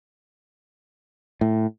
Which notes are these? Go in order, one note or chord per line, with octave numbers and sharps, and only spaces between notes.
A2